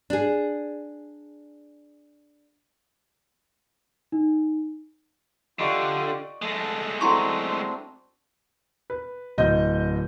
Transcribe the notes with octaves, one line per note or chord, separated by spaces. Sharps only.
D4 G#4
D#4
D3 F4 G4 D5 D#5 C#6
G#3 A3 A4
C4 D4 E4 F#4 A4 A#5 C6 C#6
B4
D1 D#5 G6